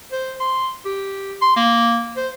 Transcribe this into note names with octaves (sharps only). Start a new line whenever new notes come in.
C5
C6
G4
C6
A#3
C5